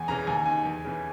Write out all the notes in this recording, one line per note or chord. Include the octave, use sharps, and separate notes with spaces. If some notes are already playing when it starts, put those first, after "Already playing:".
Already playing: E2 G#5
C#3 E3 A#5
D#2 G#5
D#3 G#5
E2
C#3 E3